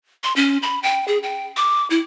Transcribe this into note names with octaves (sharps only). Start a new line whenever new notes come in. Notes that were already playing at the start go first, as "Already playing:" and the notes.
C6
C#4
B5
G5
G#4
G5
D6
E4